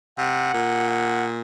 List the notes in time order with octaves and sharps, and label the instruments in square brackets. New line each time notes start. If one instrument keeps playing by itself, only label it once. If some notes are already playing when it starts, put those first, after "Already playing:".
[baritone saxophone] C3 [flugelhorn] F#5
[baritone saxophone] A#2
[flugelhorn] F#5